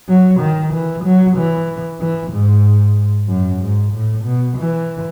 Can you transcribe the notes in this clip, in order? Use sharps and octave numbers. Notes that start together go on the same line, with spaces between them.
F#3
D#3
E3
F#3
E3
E3
G#2
F#2
G#2
A2
B2
E3